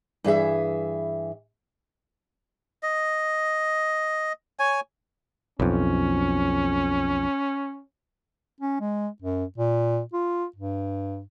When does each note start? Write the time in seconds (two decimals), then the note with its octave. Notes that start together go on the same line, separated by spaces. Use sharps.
0.24 G2 E3 G#4 E5
2.83 D#5
4.59 C#5 G#5
5.60 B1 F2 C#4
8.60 C#4
8.81 G#3
9.22 F#2
9.58 A#2
10.13 F4
10.56 G2